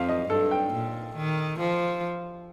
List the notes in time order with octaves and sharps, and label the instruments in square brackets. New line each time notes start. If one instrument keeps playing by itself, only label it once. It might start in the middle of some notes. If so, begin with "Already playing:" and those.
Already playing: [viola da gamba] F2 [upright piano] F5
[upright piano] D#5
[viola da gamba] G2 [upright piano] A4
[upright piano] G5
[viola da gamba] A#2
D#3
F3